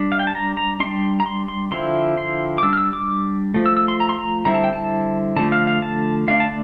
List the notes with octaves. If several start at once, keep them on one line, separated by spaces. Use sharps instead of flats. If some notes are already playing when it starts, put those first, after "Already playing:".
Already playing: G3 D4
F5
G5
A5
A#5
A#5
G3 D4 C6
A#5
C6
C6
D3 F3 C4 E4 C6
C6
D6
G3 D4 E6
F6
E6
D6
F3 A3
E6
E6
C6
A#5
C6
A#5
D3 G3 C4 E4 A#5
A5
G5
A5
D3 F3 A3 A5
F5
F5
A5
D3 A3 D4 F5
A5